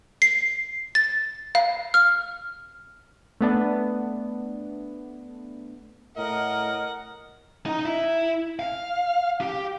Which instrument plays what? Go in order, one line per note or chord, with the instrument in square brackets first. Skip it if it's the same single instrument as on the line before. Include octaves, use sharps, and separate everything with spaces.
[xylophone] C7
A6
F5
F6
[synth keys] A3 B3 D4
[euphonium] A2 [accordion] A#4 [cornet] D#5 [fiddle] F#5
[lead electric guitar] D#4
E4
F5
G4